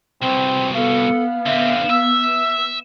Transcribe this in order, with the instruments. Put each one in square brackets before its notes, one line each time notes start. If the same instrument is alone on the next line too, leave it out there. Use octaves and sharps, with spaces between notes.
[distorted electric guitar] C2 B2 [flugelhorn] C4
[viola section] B3 [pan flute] A4 [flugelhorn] F5
[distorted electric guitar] D3 C4 [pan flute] E5
[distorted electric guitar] E5 [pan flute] E6